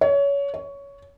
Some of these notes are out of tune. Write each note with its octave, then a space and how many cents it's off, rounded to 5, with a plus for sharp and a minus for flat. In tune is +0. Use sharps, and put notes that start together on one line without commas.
C#5 +25
C#5 +15